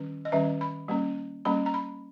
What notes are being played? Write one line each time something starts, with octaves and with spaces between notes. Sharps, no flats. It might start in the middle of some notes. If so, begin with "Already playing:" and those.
Already playing: D#3 G3 C#4
D#5
D#3 G3 C#4 E5
B5
G3 A#3 C#4
G3 A#3 C#4 B5
A#5
B5